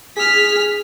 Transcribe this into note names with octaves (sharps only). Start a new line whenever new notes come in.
G#4 F6 B6